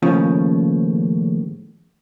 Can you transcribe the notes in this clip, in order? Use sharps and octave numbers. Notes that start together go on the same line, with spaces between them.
D#2 A2 C#3 F3